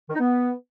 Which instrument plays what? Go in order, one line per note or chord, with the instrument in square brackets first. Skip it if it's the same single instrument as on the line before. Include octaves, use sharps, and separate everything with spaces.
[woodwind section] D#3
D#4
B3